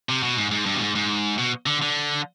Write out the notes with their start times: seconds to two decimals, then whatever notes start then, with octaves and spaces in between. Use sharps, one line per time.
0.09 C3
0.23 B2
0.38 G#2
0.51 G#2
0.66 G2
0.75 B2
0.81 G#2
0.95 G#2
1.38 B2
1.66 D3
1.82 D3